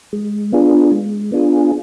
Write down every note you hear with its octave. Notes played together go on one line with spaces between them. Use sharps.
G#3
B3 D4 F4 G#4
G#3
B3 D4 F4 G#4